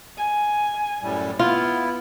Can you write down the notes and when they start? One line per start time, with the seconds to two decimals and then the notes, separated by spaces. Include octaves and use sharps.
0.18 G#5
1.02 F#2 A2 G3
1.39 B3 E4 F4